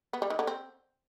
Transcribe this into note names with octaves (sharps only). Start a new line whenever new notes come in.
B3
G3
D#3
D3
C4